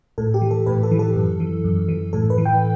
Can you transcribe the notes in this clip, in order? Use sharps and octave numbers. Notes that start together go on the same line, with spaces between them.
A2 A4
G4
E3
A4
A2 B4
A4
E3
A4
F#2
E3
F#2
E3
A2 A4
B4
E3
G5